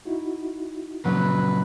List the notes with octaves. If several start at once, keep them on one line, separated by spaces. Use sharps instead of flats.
D#4 E4 F#4
A#2 C#3 F#3 B4